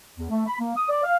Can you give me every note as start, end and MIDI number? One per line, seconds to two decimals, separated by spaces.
0.17 0.30 40
0.30 0.46 57
0.47 0.55 83
0.60 0.74 58
0.76 0.85 87
0.89 1.02 74
1.03 1.15 77